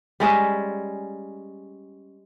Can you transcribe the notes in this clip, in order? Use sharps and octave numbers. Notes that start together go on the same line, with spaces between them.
G3 G#3 C#4 E5